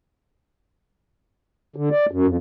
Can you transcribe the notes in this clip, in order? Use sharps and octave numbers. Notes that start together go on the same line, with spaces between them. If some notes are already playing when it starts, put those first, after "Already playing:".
D3
D5
F#2
F2